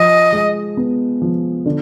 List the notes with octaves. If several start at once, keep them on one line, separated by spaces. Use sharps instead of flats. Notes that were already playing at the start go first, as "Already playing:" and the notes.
Already playing: F3 D#5
G#3
B3
F3
D3